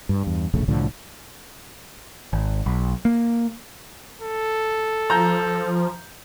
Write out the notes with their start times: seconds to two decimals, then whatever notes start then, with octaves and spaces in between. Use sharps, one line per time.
0.09 G2
0.23 E2 G2
0.54 E1 A#1 C#3 A3
0.68 C2 A2 D3 F3
2.33 G#1
2.66 B1
3.05 A#3
4.22 A4
5.10 F3 A#5 G6